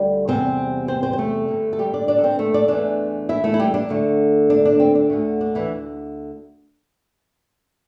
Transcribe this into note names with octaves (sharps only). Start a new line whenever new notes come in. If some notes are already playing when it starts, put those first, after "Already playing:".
Already playing: D2 D3 G3 G4
E2 C3 G3 C4 C5
C4 C5
C4 C5
C5
A3 A4
G2 D3 G3
A4
G3 G4
D4 D5
D4 D5
A4
C4 C5
A3 A4
D4 D5
E2 E3 A3 D4 D5
E4 E5
A3 A4
E4
G3 G4
D4
D2 D3 A3
D4
D4
C4
D4
D2 D3 A3
D4
E3 E4